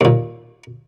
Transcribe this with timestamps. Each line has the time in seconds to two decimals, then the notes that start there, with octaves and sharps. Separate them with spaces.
0.01 D#2 A#2